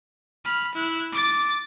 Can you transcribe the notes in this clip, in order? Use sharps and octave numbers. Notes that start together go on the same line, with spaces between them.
B5 F6
E4 F#6
D6 A6